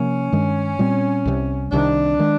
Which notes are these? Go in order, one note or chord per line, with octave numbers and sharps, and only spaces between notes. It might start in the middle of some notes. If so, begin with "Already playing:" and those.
Already playing: C3 F3 A#3 C#4
G2 D#3 G#3
A#2 G3 C4
C2 C3 E3 G3
C2 C3 D#3 D4
D#3 G#3